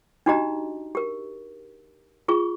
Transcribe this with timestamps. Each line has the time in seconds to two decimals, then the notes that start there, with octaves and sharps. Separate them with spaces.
0.26 D4 D#4 F#4 G4 D#5 A#5
0.95 G4 A#4
2.28 F4 G#4 C#6